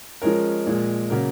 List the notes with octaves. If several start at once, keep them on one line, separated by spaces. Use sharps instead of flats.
F3 G#3 C#4 A#4
A#2 F3 G#3
C#3 F#3 A#3 A#4